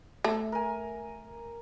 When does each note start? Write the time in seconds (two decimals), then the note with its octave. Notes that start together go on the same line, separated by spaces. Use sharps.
0.24 A3
0.52 A#4 G#5